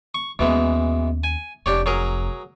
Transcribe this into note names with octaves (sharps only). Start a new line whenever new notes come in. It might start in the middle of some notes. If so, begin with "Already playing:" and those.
C#6
D#2 B2 E3 G#3 C#4
G#5
F1 D4 G4 C#5
F#3 G#4 A#4